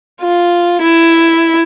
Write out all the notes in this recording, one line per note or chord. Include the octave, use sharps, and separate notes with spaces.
F4
E4